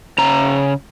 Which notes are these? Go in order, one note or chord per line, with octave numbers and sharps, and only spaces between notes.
C#3 A#5